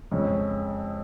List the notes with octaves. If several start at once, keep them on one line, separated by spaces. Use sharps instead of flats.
F2 C#3 G#3 C#4